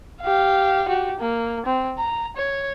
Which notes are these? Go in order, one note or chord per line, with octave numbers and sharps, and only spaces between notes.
G4 F5
F#4 G4
A#3
C4
A#5
C#5